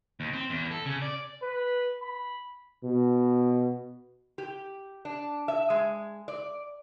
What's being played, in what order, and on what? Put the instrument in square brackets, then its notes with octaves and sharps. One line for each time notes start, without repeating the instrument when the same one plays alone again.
[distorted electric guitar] D#2
C4
E2
A4
C#3
D5
[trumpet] B4
B5
[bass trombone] B2
[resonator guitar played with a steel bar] G4
D4
E5
G#3
D5